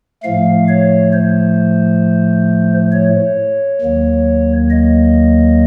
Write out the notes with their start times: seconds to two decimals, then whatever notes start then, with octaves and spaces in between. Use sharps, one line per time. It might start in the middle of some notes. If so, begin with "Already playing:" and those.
0.23 A2 F3 A3 F5
0.69 C#5
1.13 C5
2.92 C#5
3.81 D#2 D#3 F#3 A#3
4.71 D#5